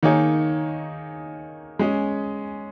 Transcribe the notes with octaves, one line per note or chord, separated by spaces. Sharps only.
D#3 A#3 D#4 G#4 C#5
G#3 C#4 G#4